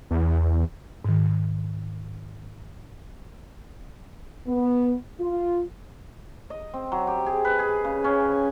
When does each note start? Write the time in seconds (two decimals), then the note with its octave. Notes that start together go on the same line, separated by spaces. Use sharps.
0.11 E2
1.05 G#2 D#3
4.47 B3
5.19 F4
6.50 D#5
6.74 C4
6.92 F#3
7.07 G4
7.26 G#4
7.45 B4
7.59 G#4
7.85 C#3
8.04 C#4
8.32 G#5